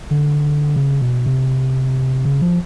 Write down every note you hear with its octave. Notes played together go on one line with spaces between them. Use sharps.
D3
C#3
B2
C3
C#3
F3